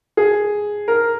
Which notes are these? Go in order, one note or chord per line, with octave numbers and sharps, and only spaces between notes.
G#4
A#4